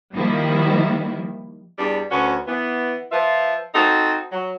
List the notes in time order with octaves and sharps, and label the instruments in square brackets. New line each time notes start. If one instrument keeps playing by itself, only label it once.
[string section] D#3 F3 G3 A#3 E4
[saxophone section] E2 G3 D4
D2 C#4 F#4 B4
E3 B3
F3 F4 B4 E5
C4 D#4 F#4 A4
F#3